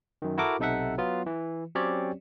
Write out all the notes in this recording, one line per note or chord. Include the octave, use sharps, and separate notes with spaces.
F#2 D#3
E4 F#4 A4 A#4 D6
B1 C3 D#4 A4 E5 F#5
F#3 B3 F4
E3
F#3 C4 C#4 G4 C#5 D5